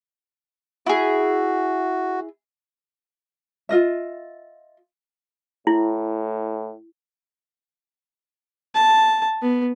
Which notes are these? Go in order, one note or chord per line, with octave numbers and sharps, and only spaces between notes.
E4 F#4 G#4
F4 D#5 E5
A2 E4
A5
B3